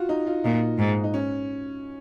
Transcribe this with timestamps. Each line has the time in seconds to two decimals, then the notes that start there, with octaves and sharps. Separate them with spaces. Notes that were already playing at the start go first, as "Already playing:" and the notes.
Already playing: F4 F#4
0.09 D#4
0.27 F4
0.44 A#2 D#4
0.79 G#2
1.04 D#4
1.14 C#4